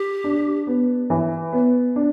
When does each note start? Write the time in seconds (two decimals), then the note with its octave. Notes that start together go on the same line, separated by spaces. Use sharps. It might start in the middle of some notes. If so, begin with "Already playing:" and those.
Already playing: G4
0.24 D4
0.67 B3
1.10 E3
1.53 B3
1.96 D4